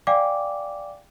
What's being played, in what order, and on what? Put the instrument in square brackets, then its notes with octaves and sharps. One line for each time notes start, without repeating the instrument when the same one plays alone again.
[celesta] D5 F5 G5 G#5 D6